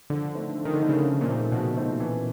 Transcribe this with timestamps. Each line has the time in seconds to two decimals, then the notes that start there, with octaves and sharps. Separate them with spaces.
0.10 D3 F3
0.34 A3 C4 D#4
0.58 F3
0.65 D#3
0.73 D3
0.81 A3 C4 D#4
0.89 C#3
1.05 C#3 F3
1.21 A#2
1.29 A3 C4 D#4
1.52 B2 F3
1.77 A3 C4 D#4
2.00 E3